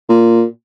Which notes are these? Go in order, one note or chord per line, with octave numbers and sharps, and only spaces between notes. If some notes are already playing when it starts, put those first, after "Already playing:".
A#2